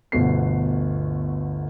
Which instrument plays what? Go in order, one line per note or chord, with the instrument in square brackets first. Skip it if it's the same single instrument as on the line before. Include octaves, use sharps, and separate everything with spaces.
[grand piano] G1 D2 B2 C7